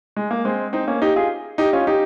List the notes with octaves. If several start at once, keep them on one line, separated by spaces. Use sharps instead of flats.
G#3
A#3
G#3 C4
C4 D#4
A#3 C#4
D#4 G4
F4 G#4
D#4 G4
C#4 F4
D#4 G4